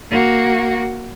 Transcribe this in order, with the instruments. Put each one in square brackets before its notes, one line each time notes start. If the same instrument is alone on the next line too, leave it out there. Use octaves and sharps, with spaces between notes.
[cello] A#3 F#4